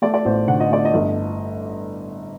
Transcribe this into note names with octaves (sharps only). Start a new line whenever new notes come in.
A3 D5
D5
A1 C5
D3 F#5
D#5
A3 D5
D#5
G1